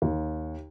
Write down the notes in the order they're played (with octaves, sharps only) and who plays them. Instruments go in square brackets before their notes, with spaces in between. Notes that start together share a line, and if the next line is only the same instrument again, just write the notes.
[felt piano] D#2